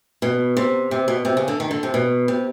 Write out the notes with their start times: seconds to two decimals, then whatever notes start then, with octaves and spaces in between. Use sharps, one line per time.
0.22 B2
0.57 C3
0.91 C3
1.08 B2
1.25 C3
1.37 C#3
1.48 D3
1.60 D#3
1.71 D3
1.83 C3
1.94 B2
2.28 C3